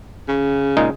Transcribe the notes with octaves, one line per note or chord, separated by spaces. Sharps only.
C#3
A#2 G#3 D#4